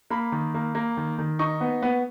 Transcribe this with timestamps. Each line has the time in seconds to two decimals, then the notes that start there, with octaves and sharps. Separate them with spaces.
0.10 A#3 B5
0.32 D#3
0.54 A#3
0.75 A#3
0.97 D#3
1.18 D#3
1.39 D#4 C#6
1.61 B3
1.82 B3